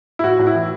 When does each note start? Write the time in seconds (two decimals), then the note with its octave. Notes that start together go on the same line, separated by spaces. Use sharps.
0.19 E4
0.24 A2 F#4
0.39 A2
0.47 E4
0.55 E3